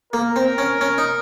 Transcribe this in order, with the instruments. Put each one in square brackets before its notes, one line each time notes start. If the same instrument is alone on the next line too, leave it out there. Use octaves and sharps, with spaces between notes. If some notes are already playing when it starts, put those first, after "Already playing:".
[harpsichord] A#3 [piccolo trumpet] A#4
[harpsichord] C4
C#4
C#4
D#4